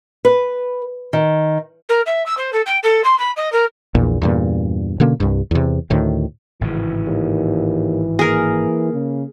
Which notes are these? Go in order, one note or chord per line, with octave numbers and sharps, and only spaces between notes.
B4
D#3
A#4
E5
E6
C5
A4
G5
A4
C6
B5
D#5
A#4
A#1 E2 A#2
E2 G2 A#2
B2 D3 A#3 C#4
C2 G2
E2 C3
D2 A2 D#3
G#1 A2 C#3 E3
D#2
A#3 G#4 A#4
C#3